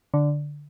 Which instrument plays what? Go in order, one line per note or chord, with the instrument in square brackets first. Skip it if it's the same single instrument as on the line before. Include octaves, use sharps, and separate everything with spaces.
[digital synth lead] D3